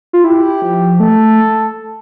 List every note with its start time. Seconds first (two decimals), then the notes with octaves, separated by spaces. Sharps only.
0.13 F4
0.24 E4 G4
0.62 F3
1.00 A3 A4